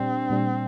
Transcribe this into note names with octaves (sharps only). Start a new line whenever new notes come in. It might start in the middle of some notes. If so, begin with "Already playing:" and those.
Already playing: A#2 G3 C4 D4
A#2 G3 D4